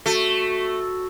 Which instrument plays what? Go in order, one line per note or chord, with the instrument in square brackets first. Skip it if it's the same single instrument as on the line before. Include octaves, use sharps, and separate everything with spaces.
[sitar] A3 [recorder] F#4